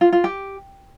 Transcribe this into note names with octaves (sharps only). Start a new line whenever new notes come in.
F4
F4
G4